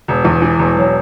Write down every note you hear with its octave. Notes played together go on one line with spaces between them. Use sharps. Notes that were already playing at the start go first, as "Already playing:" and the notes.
E1
E2
E3
E1
F#3